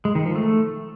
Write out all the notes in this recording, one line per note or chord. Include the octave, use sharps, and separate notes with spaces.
G#3
D#3
F3
A3